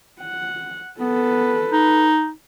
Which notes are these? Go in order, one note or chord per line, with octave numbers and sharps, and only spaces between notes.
F#5
B3 A4 B4
D#4